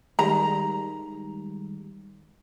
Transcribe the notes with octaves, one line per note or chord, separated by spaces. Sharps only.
D#3 G3 G#3 A#5